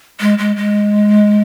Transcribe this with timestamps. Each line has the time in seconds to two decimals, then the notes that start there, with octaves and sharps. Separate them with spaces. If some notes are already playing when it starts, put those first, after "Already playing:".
0.21 G#3
0.38 G#3
0.56 G#3